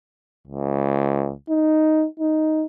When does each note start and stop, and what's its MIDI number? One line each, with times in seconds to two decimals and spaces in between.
0.47 1.32 37
1.50 2.06 63
2.20 2.65 63